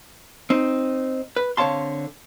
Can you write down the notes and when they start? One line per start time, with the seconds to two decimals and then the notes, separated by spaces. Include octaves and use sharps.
0.50 C4 D#4
1.36 B4
1.57 D3 C4 C#5 F5 A5 C6